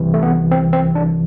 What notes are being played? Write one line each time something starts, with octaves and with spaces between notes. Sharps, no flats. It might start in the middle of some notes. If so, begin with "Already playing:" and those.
Already playing: C2 C3 E3
A3
B3
C4
C4
D4